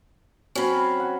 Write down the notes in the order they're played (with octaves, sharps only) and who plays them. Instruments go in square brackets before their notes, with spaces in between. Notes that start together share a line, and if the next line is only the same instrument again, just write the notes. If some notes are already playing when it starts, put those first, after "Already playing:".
[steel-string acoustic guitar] F#3 C4 [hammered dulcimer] C#4 B5
[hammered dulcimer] F#5